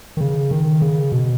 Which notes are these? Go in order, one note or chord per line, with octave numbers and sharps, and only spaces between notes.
D#3
C#3
D#3
C#3
B2